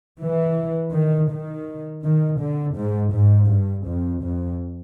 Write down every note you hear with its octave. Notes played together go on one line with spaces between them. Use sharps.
E3
D#3
D#3
D#3
D3
G#2
G#2
G2
F2
F2